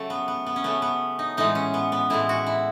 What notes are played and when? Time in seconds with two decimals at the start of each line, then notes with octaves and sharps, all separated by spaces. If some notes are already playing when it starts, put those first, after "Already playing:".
Already playing: C#3 F#3 A3
0.10 B3
0.28 B3
0.47 B3
0.56 C#4
0.64 C#3 F#3 A3 B3
0.82 B3
1.19 D#4
1.37 A2 E3 G#3 D#4
1.55 C#4
1.74 B3
1.92 B3
2.10 A2 E3 G#3 E4
2.29 F#4
2.47 E4